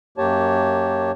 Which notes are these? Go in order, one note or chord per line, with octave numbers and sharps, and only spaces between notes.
F#2 A#3 G4 C#5 A5